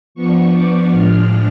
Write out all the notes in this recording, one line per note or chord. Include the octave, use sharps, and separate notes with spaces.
F3 B3 D4 C#6
D6
A2 F3 G#3 D4 F6